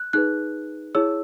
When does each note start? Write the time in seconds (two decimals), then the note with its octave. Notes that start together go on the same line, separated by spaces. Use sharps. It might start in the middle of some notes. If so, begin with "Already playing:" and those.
Already playing: F#6
0.13 D#4 G#4 B4 F#6
0.95 E4 G#4 C#5 E6